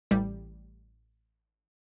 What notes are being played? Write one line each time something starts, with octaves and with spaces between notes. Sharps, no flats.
A1 G3